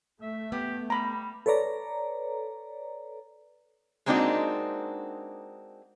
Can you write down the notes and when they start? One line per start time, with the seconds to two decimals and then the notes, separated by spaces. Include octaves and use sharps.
0.22 A3 E5
0.52 B3 G4
0.90 G3 A#5 B5
1.46 A4 B4 C#5 D5 A#5
4.06 G#3 A#3 C4 D4 D#4 F#4